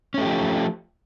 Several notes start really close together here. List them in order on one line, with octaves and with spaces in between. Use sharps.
C#4 A3 G4 F3